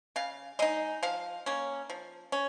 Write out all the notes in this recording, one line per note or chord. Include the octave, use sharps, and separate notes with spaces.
C#3 F5
G#3 D#4 D#5
F3 F5
A#3 C#4
F3
C#4